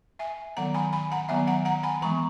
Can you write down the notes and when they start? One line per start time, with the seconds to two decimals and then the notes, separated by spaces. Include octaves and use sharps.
0.19 E5 G#5
0.57 D#3 F#3 B3 F#5 A#5
0.74 G#5 B5
0.93 G#5 B5
1.12 F#5 A#5
1.29 D#3 F#3 B3 E5 G#5
1.47 F#5 A#5
1.65 F#5 A#5
1.83 G#5 B5
2.02 E3 G#3 B3 A#5 C#6